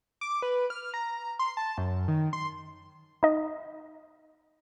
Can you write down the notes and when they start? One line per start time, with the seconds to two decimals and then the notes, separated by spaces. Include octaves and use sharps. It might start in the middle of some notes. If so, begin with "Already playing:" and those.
0.21 D6
0.42 B4
0.70 F6
0.94 A#5
1.39 C6
1.57 A5
1.78 F#2
2.08 D#3
2.33 C6
3.23 D#4 D#5